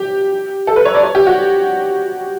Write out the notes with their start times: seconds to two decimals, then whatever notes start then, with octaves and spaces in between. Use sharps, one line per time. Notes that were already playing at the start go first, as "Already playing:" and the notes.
Already playing: G4
0.67 A4
0.76 B4
0.85 C#5
0.95 D5
1.03 C#5
1.15 G4
1.27 F#4